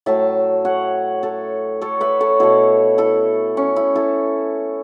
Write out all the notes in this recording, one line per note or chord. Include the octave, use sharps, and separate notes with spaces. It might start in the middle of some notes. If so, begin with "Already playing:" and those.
A2 F#3 A3 E5 A5
C#5 F#5
A4 C#5
A4 C#5
B4 E5
A4 C#5
B2 A3 E4 A4
E4 A4
C#4
E4
E4 A4